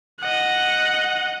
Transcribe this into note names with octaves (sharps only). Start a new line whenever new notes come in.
D#5 F#5